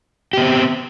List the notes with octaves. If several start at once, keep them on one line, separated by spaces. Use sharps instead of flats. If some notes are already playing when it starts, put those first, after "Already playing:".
B3 C4 G4